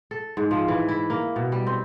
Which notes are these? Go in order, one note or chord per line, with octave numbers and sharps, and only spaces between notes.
A4
G#2
F3
E3
E4
A#3
B2
G3
C4